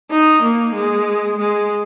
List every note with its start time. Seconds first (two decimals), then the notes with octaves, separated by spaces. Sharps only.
0.11 D#4
0.42 A#3
0.74 G#3
1.38 G#3